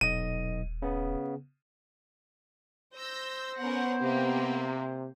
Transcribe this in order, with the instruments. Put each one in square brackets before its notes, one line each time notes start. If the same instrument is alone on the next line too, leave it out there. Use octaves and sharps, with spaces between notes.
[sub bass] D#1 [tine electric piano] B1 D#5 [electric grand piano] D#7
[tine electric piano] C#3 B3
[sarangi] C5 [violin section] E6 G6 A#6
[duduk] B3 [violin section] C#4 A#4 F#5
[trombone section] C3 [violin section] A#3 C4 G4